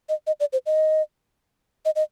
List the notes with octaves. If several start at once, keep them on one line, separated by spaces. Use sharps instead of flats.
D#5
D#5
D5
C5
D#5
D#5
D#5